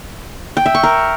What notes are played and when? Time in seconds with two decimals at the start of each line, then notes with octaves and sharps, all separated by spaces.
0.57 G5
0.66 E5
0.75 C#6
0.83 A#4